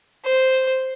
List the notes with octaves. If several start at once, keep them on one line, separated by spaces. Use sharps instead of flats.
C5